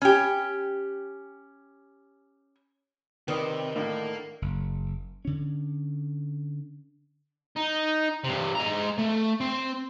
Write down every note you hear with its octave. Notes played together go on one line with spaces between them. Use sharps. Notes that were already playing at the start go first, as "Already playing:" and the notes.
C#4 G4
C3 D#3 B4 D5 D#6
A2 D3 A3 A#3
F#1
D3 C#4
D#4
G2 C3
G#3 A#5
A3
C4